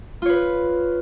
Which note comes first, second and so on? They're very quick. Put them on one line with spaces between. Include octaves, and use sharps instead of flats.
F4 C#5 B4